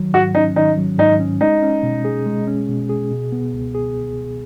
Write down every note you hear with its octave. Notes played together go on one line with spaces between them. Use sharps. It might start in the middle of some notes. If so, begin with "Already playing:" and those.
Already playing: D#3 F#3
G#2 F#4
C#4 D#4
D#3 D#4
F#3
G#2 D#4
C#4
G#3 D#4
C#4
B2
G#4
G#3
C#4
B2
G#4
B2
B3
C#2
G#4